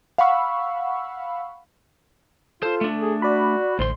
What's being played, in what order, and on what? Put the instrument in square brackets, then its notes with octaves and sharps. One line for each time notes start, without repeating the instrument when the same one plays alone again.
[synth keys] F5 F#5 B5 C#6 E6
[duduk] F4 [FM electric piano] A4 [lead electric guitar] C5
[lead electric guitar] A3 D4
[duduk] G#4
[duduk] F#4 [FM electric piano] D5 B5
[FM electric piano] A1 [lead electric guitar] D2 C6 [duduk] C5